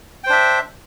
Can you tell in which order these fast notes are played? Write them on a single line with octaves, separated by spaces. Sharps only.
G5 C5 D4 E5